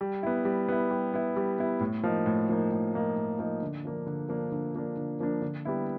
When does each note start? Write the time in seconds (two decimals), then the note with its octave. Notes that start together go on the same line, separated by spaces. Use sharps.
0.01 G3
0.23 B3 E4
0.45 G3
0.69 B3 E4
0.91 G3
1.14 B3 E4
1.36 G3
1.59 B3 E4
1.80 A2
2.04 F3 A#3 D#4
2.26 A2
2.49 F3 A#3 D#4
2.71 A2
2.94 F3 A#3 D#4
3.16 A2
3.39 F3 A#3 D#4
3.62 D3
3.85 F3 A#3 D4
4.06 D3
4.29 F3 A#3 D4
4.52 D3
4.74 F3 A#3 D4
4.97 D3
5.20 F3 A#3 D4
5.42 D3
5.65 G3 B3 E4